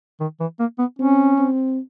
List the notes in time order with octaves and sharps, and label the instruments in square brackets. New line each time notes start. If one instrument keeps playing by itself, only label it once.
[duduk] D#3
E3
A#3
B3
[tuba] C4 [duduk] C#4
[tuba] C4